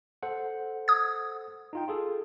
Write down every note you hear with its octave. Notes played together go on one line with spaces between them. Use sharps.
A4 C5 F#5
D#6 G#6
D#4 F4 G5
F4 G#4 A4